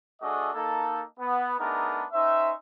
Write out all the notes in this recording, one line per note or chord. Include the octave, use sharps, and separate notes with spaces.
A3 D4 F#4 G#4 A4 D#5
A#3 D#4 A4
B3
A3 B3 D4 D#4 G#4 A#4
C#4 D#4 C5 E5